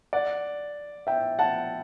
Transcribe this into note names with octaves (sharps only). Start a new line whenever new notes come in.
D5 F#5
E5 G5
F#5 A5